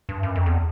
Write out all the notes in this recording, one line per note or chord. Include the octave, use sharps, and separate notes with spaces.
G2
F#2
F2
E2